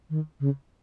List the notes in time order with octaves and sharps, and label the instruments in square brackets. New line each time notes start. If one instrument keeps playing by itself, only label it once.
[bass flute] D#3
C#3